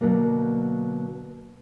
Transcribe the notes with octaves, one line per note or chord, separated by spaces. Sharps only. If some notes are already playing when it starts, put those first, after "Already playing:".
B2 D3 F#3 A#3